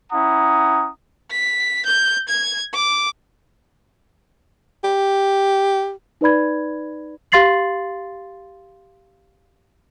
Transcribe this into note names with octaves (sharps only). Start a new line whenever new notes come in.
C#4 E4 F#5 A#5 D#6
B6
G6
G#6
D6
G4
D#4 B4 D5 B5 G#6
G4 F5 C6 A6 C7 F#7